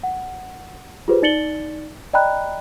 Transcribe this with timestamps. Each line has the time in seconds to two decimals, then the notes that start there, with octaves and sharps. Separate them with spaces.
0.03 F#5
1.08 F4 G4 G#4 B4 C5
1.22 D#4 D5 A6 C#7 F#7 G7
2.13 D5 D#5 G5 A#5 B5 F#6